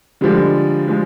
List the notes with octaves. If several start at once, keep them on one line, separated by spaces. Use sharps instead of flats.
D3 F3 G3 G#3
F3 G#3